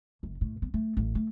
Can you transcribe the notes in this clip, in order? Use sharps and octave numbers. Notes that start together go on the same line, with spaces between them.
F#1
A2
B3
A3
A1
A3